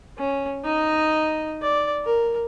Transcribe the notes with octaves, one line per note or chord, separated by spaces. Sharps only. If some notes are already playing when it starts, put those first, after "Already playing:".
C#4
D#4 D#5
D5
A#4